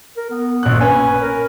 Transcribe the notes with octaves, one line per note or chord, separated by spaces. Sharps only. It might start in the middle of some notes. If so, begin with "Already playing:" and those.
A#4
B3
A#1 F#6
C#4 B4 G#5
A#4